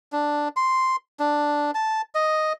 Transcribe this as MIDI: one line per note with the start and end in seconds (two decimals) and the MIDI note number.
0.13 0.48 62
0.57 0.96 84
1.20 1.71 62
1.75 2.02 81
2.15 2.53 75